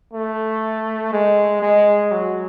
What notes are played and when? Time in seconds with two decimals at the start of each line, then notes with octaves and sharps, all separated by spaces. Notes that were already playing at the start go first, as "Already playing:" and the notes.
0.13 A3
1.13 G#3
1.62 G#3
2.12 F#3